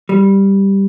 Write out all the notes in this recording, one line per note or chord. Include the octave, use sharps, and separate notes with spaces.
G3